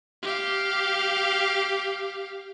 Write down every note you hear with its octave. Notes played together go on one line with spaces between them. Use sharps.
G4 F5